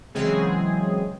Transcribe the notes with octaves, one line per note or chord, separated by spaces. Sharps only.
C#3 E3 F#3 G#3 C4 G#4